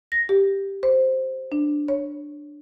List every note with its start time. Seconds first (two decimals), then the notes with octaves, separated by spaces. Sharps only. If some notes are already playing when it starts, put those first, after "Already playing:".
0.12 A#6
0.29 G4
0.83 C5
1.52 D4
1.88 C#5